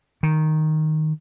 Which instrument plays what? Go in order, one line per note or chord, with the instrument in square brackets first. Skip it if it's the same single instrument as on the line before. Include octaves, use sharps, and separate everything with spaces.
[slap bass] D#3